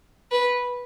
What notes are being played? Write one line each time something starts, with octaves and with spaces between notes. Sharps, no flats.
B4